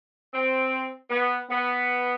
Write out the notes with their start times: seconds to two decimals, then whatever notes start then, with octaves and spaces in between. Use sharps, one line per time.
0.33 C4
1.10 B3
1.50 B3